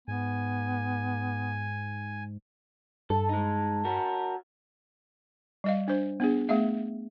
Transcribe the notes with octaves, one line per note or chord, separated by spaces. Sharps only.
G#2 B3 G#5
G2 A4 A5
G#3 D#4
F#4 A#4
G3 D#5 F5
D4 C5
B3 D4 G#4
A3 B3 G#4 E5 F5